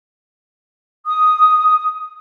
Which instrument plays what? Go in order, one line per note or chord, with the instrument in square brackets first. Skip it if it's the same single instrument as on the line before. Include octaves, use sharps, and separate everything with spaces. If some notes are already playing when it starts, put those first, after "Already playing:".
[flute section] D#6